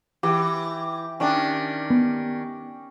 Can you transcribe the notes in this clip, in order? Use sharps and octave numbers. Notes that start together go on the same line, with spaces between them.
E3 G4
D#3 C#4 D4 G5
B3